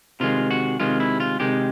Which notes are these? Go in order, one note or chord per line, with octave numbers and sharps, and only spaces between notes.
C3 D#3 G#3 F4
F#4
C3 D#3 G#3 F4
E4
F4
C3 D#3 G#3 G4